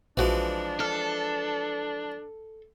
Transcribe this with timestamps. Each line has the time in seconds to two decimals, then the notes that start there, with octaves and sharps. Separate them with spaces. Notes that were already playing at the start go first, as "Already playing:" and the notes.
0.17 A#1 E3 F3 G#3 D4 F#4
0.80 A4 F6